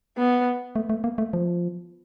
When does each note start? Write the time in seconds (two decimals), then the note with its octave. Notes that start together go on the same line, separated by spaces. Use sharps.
0.18 B3
0.76 A3
0.90 A3
1.04 A#3
1.18 A3
1.33 F3